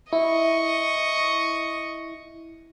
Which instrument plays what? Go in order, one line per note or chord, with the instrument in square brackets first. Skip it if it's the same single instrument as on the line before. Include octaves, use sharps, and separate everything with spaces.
[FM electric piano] E4 [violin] D#5 C#6